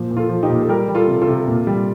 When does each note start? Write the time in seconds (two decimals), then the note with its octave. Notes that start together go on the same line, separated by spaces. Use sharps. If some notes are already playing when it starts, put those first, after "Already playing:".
Already playing: A#2 F3
0.10 A#2
0.17 F4 A4
0.29 F3
0.43 D#4 G4
0.49 A#2
0.62 A4
0.69 G3 G4 A#4
0.88 G3
0.95 F4 A4
1.08 C3
1.22 F4 A4
1.27 C3
1.48 A#2
1.67 G3